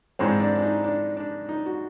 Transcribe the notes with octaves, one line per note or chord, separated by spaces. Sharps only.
G#2 E3 G#3 C4 D4
D4
D4
D#4
D4
D4
D#4
F#4